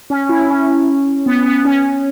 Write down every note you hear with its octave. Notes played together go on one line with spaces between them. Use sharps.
C#4
E4
C#4
B3
B3
C#4